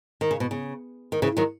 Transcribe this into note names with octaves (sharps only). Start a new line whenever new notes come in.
D#3
C#3
B2
C#3
D#3
C#3 E3
D#3 F#3